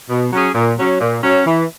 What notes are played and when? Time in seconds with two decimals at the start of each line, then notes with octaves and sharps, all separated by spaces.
0.09 B2
0.32 F#3 C#4 G#4
0.55 A#2
0.78 F#3 C#4
1.00 A#2
1.23 F#3 C#4
1.46 E3